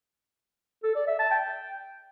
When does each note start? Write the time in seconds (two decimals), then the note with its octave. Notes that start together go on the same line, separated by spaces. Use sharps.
0.83 A4
0.95 D5
1.07 E5
1.19 A5
1.31 G5